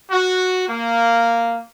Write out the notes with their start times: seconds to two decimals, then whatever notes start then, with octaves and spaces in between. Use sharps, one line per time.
0.11 F#4
0.68 A#3